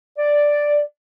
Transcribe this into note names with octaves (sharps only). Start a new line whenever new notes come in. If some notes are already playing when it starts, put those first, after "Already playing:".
D5